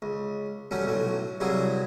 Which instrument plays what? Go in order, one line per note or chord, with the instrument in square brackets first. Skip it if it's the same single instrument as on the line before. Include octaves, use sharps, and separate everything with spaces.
[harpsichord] C#2
F#3 G3 A3 C#4
B1 A2 F#3
C2 G2 F#3 E4 G#4